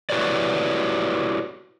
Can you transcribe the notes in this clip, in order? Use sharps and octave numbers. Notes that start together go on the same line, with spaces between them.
E4 F#4 G4 B4 C#5 D5